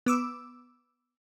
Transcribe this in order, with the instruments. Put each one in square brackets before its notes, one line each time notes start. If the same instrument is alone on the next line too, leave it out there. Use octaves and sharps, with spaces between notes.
[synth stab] B3 D6 E6